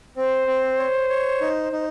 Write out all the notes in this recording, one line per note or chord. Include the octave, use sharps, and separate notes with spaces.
C4 C5
C4
C#5
C#5
D#4
D#4